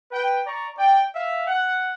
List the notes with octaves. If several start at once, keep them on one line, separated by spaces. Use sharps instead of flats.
B4 G5
D5 A#5 C#6
D5 G5
E5 F5
F#5